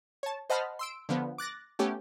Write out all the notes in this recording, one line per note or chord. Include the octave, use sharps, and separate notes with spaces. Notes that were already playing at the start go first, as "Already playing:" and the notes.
C#5 A5
C5 D#5 F#5 A5 B5 F6
C6 E6 D7
D3 F3 B3
D6 F#6 A6 A#6
A3 B3 C#4 G4